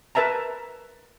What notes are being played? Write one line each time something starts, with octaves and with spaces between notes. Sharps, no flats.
A#4 B4 E5 A5 A#5